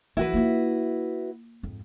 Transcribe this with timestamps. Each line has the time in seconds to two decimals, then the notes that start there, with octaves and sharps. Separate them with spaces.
0.17 E3 F3 E4 F#4 B4
0.34 A#3 F4
1.63 F2 G#2